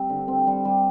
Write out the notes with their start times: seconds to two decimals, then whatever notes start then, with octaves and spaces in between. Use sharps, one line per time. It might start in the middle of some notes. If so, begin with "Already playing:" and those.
Already playing: G3 C4
0.10 D3
0.28 C4
0.47 G3
0.65 G3